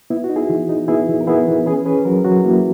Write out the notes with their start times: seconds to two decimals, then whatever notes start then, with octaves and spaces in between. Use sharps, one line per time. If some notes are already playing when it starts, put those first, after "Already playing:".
0.10 B3 E4
0.24 F#4
0.30 D#4
0.36 E4 G#4
0.50 E3
0.69 D#4
0.88 B3 E4 G#4
1.09 E3
1.21 A#4
1.27 B3 E4 G#4
1.47 E3
1.66 C#4 G#4 B4
1.86 C#4 G#4 B4
2.05 F#3 F#4 A#4
2.25 F#3 F#4
2.44 A#3 E4